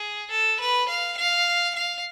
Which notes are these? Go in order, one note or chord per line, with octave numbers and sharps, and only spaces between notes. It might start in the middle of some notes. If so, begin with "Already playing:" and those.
Already playing: G#4
A4
B4
F5
F5
F5